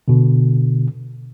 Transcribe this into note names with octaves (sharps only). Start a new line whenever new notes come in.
B2 D3